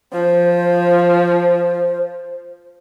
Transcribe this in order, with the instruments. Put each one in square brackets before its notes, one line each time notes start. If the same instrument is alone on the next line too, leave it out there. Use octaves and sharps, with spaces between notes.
[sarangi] F3 [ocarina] C5